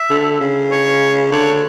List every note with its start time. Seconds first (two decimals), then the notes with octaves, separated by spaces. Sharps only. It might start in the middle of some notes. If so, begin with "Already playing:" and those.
Already playing: E5
0.10 D3
0.41 C#3
0.71 C#5
1.32 D3 C#5